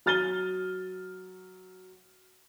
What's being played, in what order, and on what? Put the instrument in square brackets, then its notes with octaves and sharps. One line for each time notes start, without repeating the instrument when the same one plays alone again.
[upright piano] F#3 F6 A6 D#7 G7